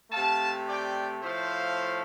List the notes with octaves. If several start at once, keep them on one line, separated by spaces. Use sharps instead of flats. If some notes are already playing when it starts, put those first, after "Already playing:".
C3 A3 F5 A5
D5 G5
A2 F3 A3 C5 F5